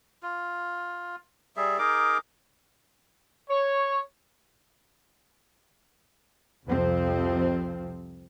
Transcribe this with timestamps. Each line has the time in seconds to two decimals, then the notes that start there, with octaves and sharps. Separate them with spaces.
0.23 F4
1.57 G3 G#4 E5
1.78 D#4 G#4 A#4 D6
3.49 C#5
6.66 C2 F2 C3 F3 C4